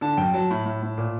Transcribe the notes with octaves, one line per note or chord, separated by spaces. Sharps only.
D3 A5
F#2 G5
F#3 A5
A2
A2
A2
A#2